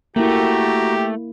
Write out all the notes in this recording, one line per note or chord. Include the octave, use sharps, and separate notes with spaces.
A3 A#3 E4 F#4 G4 G5 A#5